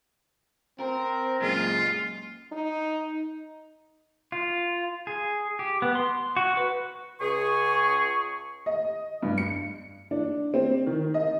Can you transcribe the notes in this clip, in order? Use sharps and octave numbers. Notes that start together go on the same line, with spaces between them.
C4 A#4
F#2 A#2 G#3 F4
D#4
F4
G#4
G4
B3
C6
F#4
B4
C#2 G#4 C#6
D#5
G2
C#7
D4
C4
D#3
D#5